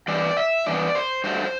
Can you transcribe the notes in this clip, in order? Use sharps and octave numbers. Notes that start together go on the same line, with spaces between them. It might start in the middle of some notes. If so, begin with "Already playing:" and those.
G2 E3 D5
E5
G2 E3 B3 D5
C5
G2 F#3 A3 C5